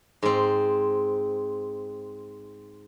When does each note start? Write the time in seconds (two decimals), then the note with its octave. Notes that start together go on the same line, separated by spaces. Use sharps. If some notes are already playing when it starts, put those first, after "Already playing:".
0.22 G#2 C4